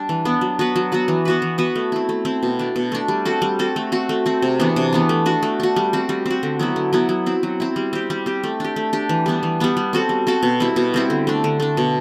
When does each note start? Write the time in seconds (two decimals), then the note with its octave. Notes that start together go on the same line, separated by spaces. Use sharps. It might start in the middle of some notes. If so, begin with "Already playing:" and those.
Already playing: G3 D4
0.09 E3
0.25 B3 D4
0.41 F#3
0.59 B3 F#4 B4
0.76 F#3
0.92 B3 F#4 B4
1.08 E3
1.25 B3 F#4 B4
1.42 E3
1.58 B3 F#4 B4
1.76 A3
1.92 C4 E4
2.09 A3
2.25 C4 E4
2.43 B2
2.59 A3 D4
2.76 B2
2.92 A3 D4
3.08 G3
3.25 C4 F#4 A4
3.42 G3
3.59 C4 F#4 A4
3.76 A3
3.92 C4 F#4
4.09 A3
4.26 C4 F#4
4.42 C3
4.60 E3 B3 D4
4.76 C3
4.93 E3 B3 D4
5.09 A3
5.26 D4 F#4
5.43 A3
5.60 D4 F#4
5.76 G3
5.93 C4 F#4
6.09 G3
6.26 C4 F#4
6.43 D3
6.59 F#3 B3 E4
6.76 D3
6.93 F#3 B3 E4
7.09 F#3
7.26 C4 E4
7.43 F#3
7.60 C4 E4
7.76 G3
7.93 C4 G4
8.10 G3
8.26 C4 G4
8.43 A3
8.60 D4 G4
8.76 A3
8.93 D4 G4
9.09 E3
9.26 G3 B3 D4
9.43 E3
9.60 G3 B3 D4
9.77 G3
9.93 C4 F#4 A4
10.09 G3
10.27 C4 F#4 A4
10.43 B2
10.60 G3 C4 E4
10.76 B2
10.94 G3 C4 E4
11.10 D3
11.27 A3 D4
11.44 D3
11.60 A3 D4
11.77 B2